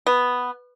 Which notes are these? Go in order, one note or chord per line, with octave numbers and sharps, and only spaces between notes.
B3